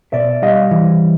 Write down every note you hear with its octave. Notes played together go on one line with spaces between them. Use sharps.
B2 D5 E5
G3 D#5 F5
E3